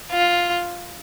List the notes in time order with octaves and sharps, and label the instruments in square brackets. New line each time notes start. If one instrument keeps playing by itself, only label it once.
[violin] F4